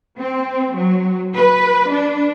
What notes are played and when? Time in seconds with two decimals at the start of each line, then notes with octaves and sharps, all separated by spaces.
0.19 C4
0.73 F#3
1.35 B4
1.92 D4